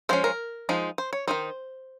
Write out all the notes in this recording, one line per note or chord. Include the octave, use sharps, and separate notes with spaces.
F3 G#3 C#4 C5
A#4
F3 G#3 D#4
C5
C#5
D#3 G#3 D#4 C5